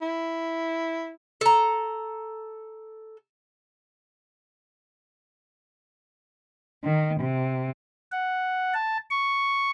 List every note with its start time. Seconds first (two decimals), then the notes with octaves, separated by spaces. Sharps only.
0.02 E4
1.41 A4 A#5
6.84 D#3
7.21 C3
8.12 F#5
8.74 A5
9.10 C#6